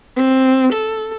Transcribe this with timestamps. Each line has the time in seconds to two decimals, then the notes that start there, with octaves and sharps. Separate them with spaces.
0.16 C4
0.73 A4